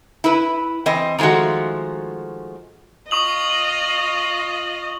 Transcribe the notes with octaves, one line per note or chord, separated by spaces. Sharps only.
E4 B4
E3 C4 D#5
D#3 F3 G#3 A3 F#4
F4 D#5 C#6 D#6 F#7